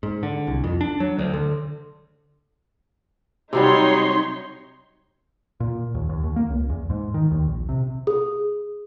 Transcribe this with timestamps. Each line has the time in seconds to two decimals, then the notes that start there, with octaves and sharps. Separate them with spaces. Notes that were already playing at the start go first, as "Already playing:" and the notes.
0.03 G#2
0.23 D3
0.47 C2
0.64 F2
0.81 D4
1.00 F#3
1.19 D2
1.33 D3
3.53 C3 F#3 G3 D#4 C#5 C6
5.60 A#2
5.94 D#2
6.09 D#2
6.24 D#2
6.36 A#3
6.50 C#2
6.70 E2
6.90 G#2
7.14 D#3
7.31 D#2
7.47 A#1
7.69 C3
8.07 G#4